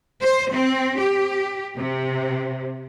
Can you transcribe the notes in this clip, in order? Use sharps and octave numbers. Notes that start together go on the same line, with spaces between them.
C5
C4
G4
C3